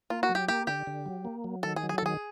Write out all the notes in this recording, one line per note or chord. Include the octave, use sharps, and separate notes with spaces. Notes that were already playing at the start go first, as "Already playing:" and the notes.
A#3 F4
F#4
F#3
G4
A#3 G4
D3 G4
D3
F#3
A#3
F#3
D#3 A4
G#4
F#3
G#4
A4
D#3 G#4